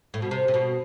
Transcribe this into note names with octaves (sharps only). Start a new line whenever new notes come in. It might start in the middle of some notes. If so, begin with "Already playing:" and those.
A2
B2
C3
C3
B2